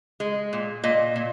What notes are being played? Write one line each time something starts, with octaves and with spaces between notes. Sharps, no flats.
G#3
A#2
A#2 D#5
A#2